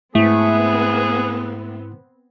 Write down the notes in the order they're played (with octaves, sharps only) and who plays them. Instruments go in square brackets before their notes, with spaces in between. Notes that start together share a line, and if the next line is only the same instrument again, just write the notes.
[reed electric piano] G#2 E4 [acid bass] A3 [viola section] B3 C4 [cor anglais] G#4